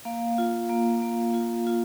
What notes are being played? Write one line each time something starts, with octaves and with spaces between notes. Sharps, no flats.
A#3 F5
F4
A#3
A#3
F4
F4